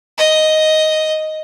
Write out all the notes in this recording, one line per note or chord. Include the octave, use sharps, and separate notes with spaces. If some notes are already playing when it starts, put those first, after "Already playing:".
D#5